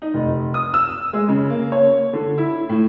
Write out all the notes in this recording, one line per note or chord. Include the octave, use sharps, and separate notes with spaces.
D#4
F1
D#6
E6
G#3
C#3
A#3
C#5
D3
E4
A2